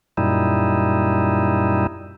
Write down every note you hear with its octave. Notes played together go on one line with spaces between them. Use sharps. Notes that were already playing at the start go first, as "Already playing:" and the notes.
F#2 A#2 G3 D#4 E4